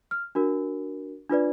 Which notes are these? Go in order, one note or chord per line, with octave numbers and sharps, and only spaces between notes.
F6
D4 F#4 A#4
D4 F4 B4 D5